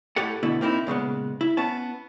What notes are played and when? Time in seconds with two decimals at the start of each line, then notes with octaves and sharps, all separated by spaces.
0.16 A2 G4 A4 F#5
0.43 B2 D3 B3 E4
0.61 A#3 C4 D#4 E4
0.87 A#2 C#3 G#3 B3
1.41 E4
1.57 B3 C#4 A5